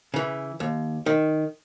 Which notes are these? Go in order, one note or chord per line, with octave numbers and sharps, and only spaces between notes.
C#3 E3
D#2
D#3